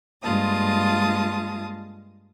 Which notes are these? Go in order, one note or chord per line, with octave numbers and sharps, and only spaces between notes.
G2 G#3 A#3 F4 A5 D#6